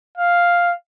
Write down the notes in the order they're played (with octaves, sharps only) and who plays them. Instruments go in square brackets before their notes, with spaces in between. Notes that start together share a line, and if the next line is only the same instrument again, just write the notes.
[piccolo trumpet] F5